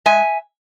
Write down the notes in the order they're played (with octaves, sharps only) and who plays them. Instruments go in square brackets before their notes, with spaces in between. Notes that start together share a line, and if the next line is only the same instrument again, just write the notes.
[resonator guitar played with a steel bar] G#3 E5 G#5